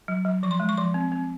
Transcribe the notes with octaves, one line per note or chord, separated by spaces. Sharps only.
F#3
F#3
F3 C#6
C6
G#3
C#6
F3 C6
C4
C4